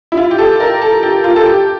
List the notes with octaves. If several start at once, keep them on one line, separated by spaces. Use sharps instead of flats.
E4
F4
G4
A4
A#4
A4
G4
F4
A4
G4